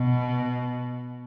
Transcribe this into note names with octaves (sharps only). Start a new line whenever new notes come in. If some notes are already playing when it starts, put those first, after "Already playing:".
Already playing: B2